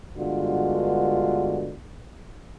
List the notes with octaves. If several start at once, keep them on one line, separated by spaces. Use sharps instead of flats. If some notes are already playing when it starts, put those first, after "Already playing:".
G2 D3 G#3 B3 F4 F#4